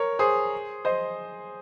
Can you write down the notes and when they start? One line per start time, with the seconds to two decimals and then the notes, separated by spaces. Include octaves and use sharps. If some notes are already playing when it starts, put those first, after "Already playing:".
Already playing: A#4 C#5
0.19 G#4 C5
0.85 C5 D#5